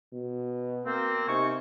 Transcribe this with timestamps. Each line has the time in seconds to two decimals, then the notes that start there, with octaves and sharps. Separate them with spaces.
0.14 B2
0.85 A#3 C4
1.28 C3 D#4 G#5 C#6